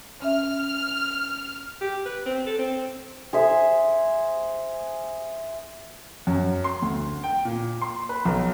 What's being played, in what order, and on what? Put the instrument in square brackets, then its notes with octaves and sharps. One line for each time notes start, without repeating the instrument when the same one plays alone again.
[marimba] C#4 E5 [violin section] F6
[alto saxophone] G4
B4
C4
A4
C4
[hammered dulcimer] G#4 C5 E5
[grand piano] F#2
C6
D2
G5
A#2
C6
B4
B1